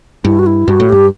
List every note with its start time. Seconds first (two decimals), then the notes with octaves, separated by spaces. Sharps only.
0.25 G2 E4
0.39 F#4
0.46 E4
0.68 G2 F#4
0.80 A2
0.89 G2 G4